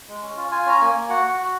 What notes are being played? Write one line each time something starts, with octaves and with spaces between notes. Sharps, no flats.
G#3
C#4
F4
F4 G#5
C#4 A#5
A#3 G#5
A#3
F#4 F#5
F#4
F#4